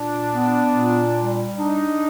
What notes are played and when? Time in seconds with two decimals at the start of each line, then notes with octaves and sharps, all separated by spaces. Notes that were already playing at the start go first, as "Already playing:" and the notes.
Already playing: A#2 D4
0.33 B3
0.74 A#2
1.15 G3
1.57 D4 D#4